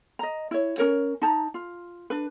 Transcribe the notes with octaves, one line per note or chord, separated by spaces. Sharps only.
D#5 A#5
E4 C#5
C#4 F#4 A#4 C#5
D#4 A5 A#5
F4
D4 B4